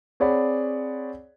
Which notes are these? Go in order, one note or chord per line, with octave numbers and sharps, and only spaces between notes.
C4 G#4 C#5 D5 F#5 B5